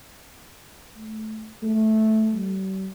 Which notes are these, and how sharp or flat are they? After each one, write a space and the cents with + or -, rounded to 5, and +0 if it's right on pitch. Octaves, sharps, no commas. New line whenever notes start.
A3 -15
A3 -10
G3 -45